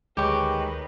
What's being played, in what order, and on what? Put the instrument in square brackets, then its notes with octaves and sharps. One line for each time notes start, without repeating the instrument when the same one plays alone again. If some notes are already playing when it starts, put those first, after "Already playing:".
[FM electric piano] D2 [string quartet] D#3 B4 [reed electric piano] G#3 C#5 G5 [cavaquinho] G4 C#6